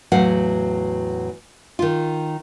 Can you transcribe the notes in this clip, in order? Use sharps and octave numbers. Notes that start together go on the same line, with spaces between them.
E2 A2 F#3 F5 F#5
D#3 F4